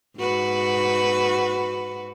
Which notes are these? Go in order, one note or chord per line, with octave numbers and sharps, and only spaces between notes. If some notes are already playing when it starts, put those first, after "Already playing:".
G#2 F#4 B4